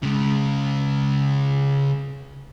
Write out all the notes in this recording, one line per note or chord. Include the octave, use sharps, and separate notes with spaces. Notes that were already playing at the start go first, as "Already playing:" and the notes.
C#3 G#3